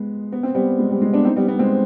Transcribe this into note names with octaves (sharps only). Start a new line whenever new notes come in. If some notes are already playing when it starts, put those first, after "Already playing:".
Already playing: G#3 B3
B3
C4
G3 B3
G#3
G3
G#3
B3 D4
C4 D#4
G3 B3
G3 B3
G#3 C4